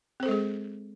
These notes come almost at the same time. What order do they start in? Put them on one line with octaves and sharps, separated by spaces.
C4 C5 A4 G#3 G#4